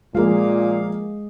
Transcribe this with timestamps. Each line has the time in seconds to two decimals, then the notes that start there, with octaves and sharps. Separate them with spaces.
0.15 A#2 F3 G#3 A#3 G#4 F5